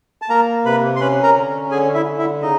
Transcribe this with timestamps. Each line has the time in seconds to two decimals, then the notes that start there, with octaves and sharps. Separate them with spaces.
0.22 A5
0.29 A#3 A#4 A#5
0.65 C3 B4 B5
0.96 C6
1.00 C#4 B4 B5
1.23 A#4 A#5
1.36 D3
1.71 D3 G#4 G#5
1.94 E4 E5
2.06 D3
2.18 E4 E5
2.42 C#3 D#4 D#5